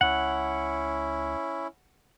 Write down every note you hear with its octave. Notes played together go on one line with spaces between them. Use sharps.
C#2 C#4 E4 F#5